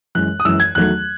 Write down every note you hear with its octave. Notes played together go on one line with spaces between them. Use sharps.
F#2 E3 G#3 F#6
D#6
F#2 E3 G#3 E6
G#6
E2 D#3 F#3 A3 F#6